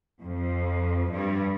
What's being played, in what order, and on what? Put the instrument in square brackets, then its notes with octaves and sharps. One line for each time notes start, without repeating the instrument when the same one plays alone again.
[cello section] F2
G2